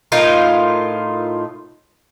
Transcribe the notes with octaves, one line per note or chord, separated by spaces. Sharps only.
A2 D#4 F4 A#4